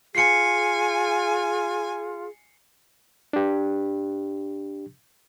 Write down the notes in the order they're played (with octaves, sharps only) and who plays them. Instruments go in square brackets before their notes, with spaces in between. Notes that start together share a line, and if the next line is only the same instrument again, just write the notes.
[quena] F4 [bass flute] G#4 [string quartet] G#5 [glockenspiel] C7 C#7
[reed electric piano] D4 G4